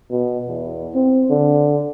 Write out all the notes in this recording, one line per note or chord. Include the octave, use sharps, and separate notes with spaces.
B2
E2
C4
D3